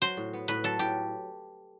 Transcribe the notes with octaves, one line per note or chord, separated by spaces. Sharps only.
F#3 C5
A2
B3
A2 B4
F#3 A4
A2 G4